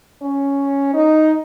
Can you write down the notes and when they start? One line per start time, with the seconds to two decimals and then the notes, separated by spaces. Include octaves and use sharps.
0.22 C#4
0.94 D#4